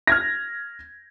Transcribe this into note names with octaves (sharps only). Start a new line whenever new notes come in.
F6 G#6 A#6